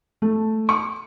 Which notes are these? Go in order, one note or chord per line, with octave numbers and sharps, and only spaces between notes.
A3
C#6